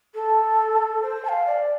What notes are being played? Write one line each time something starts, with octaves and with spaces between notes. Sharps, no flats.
A4
C5
A5
F5
D5